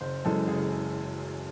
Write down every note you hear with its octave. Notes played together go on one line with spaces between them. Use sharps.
F#1 C5
F#2 E3 G#3 A4
F#1 G#4
G#4